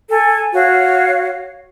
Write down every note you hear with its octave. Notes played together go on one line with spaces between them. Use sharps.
A4 G#5
F#4 C#5 F5